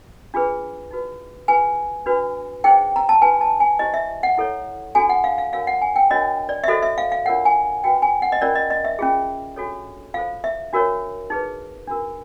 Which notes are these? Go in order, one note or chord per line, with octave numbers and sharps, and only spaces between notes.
D4 F4 G#4 B4
D#4 F#4 B4
F4 G#4 B4 G#5
D4 F#4 B4
D#4 G#4 C5 G5
A#5
A5
D4 F#4 B4 G#5
A5
G#5
E4 G4 C5 D#5
E5
F#5
E4 A4 C#5
D4 F#4 A4 G#5
F#5
F5
F5
D4 F#4 A#4 C#5 F5
F#5
G#5
G5
D4 F#4 A#4 C#5 D#5
D5
E5
F#4 A4 C5 D#5
E5
F5
F5
D4 F4 A#4 C#5 F#5
G#5
D4 F#4 B4 G5
G#5
F#5
D#5
C#4 F4 A#4 D5
D#5
D#5
E5
C#4 F4 G#4
D4 F#4 A4 C#5
F4 A4 C5 F5
E5
D4 F#4 A#4 C#5
D#4 G#4 B4
D4 F#4 A#4